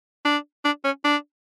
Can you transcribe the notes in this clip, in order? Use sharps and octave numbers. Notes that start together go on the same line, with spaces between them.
D4
D4
C#4
D4